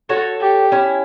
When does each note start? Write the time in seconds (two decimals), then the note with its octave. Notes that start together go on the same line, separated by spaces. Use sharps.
0.09 F#4 A4 C#5
0.40 G4
0.72 C#4 E4